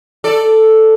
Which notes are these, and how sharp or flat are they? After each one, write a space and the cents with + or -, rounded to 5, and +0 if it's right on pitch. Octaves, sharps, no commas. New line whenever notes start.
A4 +0 D5 +0